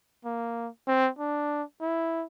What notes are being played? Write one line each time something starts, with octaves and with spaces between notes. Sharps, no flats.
A#3
C4
D4
E4